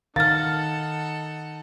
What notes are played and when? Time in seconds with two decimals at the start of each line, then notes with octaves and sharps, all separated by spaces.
0.16 D#3 D#4 A4 F5 F#5 F6 A6